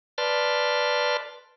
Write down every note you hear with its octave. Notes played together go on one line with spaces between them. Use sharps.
B4 D5 A5 C6 F6